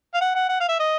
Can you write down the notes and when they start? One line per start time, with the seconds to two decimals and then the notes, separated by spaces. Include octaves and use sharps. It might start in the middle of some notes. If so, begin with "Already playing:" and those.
0.14 F5
0.21 F#5
0.35 F#5
0.49 F#5
0.60 F5
0.69 E5
0.80 D#5